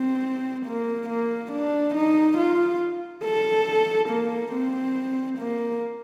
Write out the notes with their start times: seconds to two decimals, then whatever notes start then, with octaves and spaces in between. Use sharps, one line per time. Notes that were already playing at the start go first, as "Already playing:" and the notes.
Already playing: C4
0.66 A#3
1.09 A#3
1.52 D4
1.95 D#4
2.38 F4
3.24 A4
4.10 A#3
4.52 C4
5.38 A#3